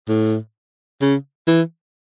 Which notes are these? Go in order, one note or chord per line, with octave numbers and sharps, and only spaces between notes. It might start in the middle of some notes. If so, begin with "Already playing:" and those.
A2
C#3
E3